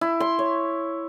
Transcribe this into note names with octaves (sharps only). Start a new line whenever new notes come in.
E4
C6
C#5